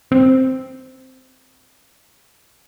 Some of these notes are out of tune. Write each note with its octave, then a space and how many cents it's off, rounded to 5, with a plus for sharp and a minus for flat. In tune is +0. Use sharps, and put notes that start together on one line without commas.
C4 -5